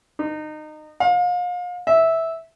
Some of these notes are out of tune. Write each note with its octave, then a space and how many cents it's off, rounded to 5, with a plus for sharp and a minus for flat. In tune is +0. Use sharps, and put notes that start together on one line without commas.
D#4 -25
F5 +35
E5 -10